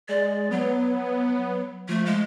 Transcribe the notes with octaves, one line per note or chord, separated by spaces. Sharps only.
G#3 D5
F#3 B3
F3 A3
G#3